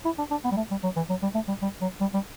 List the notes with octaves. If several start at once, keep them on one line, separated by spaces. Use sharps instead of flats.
E4
D4
D4
B3
G3
A3
G3
F#3
E3
F#3
G3
A3
G3
G3
F#3
G3
G3